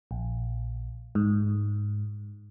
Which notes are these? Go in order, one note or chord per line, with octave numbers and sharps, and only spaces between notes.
A#1
G#2